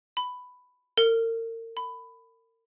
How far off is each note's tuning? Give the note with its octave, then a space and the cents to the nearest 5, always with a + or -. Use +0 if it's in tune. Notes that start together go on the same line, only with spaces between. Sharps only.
B5 +10
A#4 -40
B5 +15